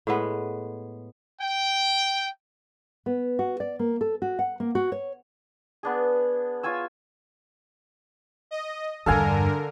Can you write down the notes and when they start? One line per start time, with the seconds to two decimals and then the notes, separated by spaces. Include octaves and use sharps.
0.07 A2 G#3 B3
1.39 G5
3.06 B3
3.39 F#4
3.60 D5
3.79 A#3
4.01 A4
4.22 F#4
4.39 F#5
4.60 A#3
4.75 F#4
4.92 C#5
5.83 B3 D4 G#4
6.63 F4 C#5 G#5 E6
8.51 D#5
9.06 E2 G2 D3 A4 A#4 F5 G#5